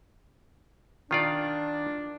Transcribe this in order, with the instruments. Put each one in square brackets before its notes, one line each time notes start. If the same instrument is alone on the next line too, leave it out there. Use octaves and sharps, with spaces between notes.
[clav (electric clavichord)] D#3 F4 D5 [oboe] D4